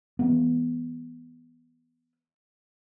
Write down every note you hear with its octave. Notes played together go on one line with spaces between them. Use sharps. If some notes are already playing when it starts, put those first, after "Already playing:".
E3 G#3 B3